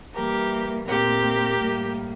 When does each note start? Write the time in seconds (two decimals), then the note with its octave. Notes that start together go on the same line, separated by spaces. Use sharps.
0.14 E3 G3 A#3 G4 A#4
0.88 A#2 A3 C4 G4 A#4
1.60 A2 G3 A#3